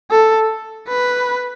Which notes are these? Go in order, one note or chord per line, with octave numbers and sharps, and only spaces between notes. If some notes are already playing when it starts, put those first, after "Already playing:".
A4
B4